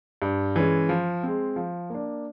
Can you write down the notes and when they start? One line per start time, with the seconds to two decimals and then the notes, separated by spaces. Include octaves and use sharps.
0.22 G2
0.56 E3 G#3 C#4
0.89 F3
1.23 G#3 C4
1.56 F3
1.90 A#3 D4